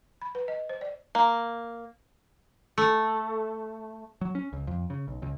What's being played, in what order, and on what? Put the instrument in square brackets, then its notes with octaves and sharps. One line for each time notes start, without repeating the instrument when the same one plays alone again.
[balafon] B5
B4
D#5
C5
D5
[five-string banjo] A#3
[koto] A3
[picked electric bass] F#3
C#4
C#2
F2
C#3
B1
C#2